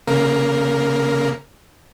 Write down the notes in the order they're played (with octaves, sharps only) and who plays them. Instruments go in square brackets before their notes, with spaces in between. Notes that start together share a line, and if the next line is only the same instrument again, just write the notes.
[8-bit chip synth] C#3 A#3 A#4